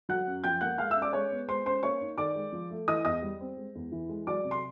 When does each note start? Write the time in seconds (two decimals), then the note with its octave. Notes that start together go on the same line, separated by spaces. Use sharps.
0.09 F#3 F#5 F#6
0.27 F#2
0.44 F3 G5 G6
0.61 A#3 F#5 F#6
0.78 G#3 F5 F6
0.90 E5 E6
0.96 C#4
1.02 D5 D6
1.13 G#3 C#5 C#6
1.31 B3
1.48 G#3 C5 C6
1.66 C#4 C5 C6
1.83 A#3 C#5 C#6
2.01 D#4
2.18 D#3 D5 D6
2.35 G#3
2.53 F3
2.71 A3
2.88 E3 D#5 D#6
3.05 E2 D#5 D#6
3.22 G3
3.40 C4
3.57 G#3
3.75 E2
3.92 E3
4.09 G#3
4.27 F#3 D5 D6
4.44 C3
4.51 C6